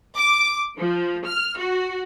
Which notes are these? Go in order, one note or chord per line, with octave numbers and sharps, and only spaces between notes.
D6
F3
F6
F#4